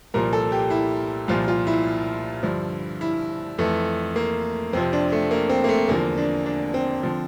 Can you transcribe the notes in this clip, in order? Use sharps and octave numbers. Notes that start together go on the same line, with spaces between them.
C2 A#2 F3 A#4
A4
G4
E4
C2 A#2 F3 F4
F4
E4
G2 D3 F3
E4
F2 E3 A3
A#3
F2 C3 F3 C4
D4
A3
A#3
C4
A#3
A3
E2 D3 F3 A#3
D4
D4
C4
D3 F3